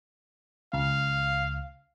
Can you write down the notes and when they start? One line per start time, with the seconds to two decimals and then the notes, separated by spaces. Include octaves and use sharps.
0.73 C#2 F5